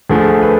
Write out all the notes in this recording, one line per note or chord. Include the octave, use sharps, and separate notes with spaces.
D2 D3 F3 A3 G#4
B4